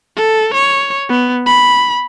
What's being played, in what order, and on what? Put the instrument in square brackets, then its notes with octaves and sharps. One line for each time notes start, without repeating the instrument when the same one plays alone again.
[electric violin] A4
C#5
B3
B5